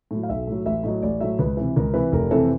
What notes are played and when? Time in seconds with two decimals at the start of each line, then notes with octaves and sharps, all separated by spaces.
0.11 A2 F#3
0.23 F5
0.29 B1 E5
0.47 A2 F#3
0.66 A1 E5
0.84 A2 F#3 D#5
1.03 A1 D5
1.21 A2 F#3 E5
1.39 C#2 B4
1.57 C3 E3
1.76 C#2 A#4
1.94 C3 E3 B4
2.12 F1 A#4
2.31 F2 C3 E3 A4